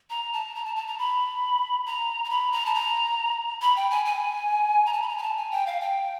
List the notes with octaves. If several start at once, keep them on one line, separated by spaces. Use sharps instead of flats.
A#5
A5
A#5
A5
A5
A#5
B5
A#5
A#5
B5
A#5
A5
A#5
B5
G5
G#5
G#5
A#5
A5
B5
A#5
G#5
A5
G#5
G5
F5
G5